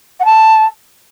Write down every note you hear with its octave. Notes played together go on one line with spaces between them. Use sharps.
F#5
A5